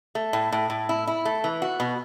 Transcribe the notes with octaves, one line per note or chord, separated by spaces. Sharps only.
A3
A2
A2
A2
E4
E4
A3
E3
F#4
B2